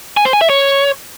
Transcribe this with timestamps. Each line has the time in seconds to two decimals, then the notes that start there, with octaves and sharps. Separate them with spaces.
0.17 G#5
0.25 C5
0.33 G#5
0.41 E5
0.50 C#5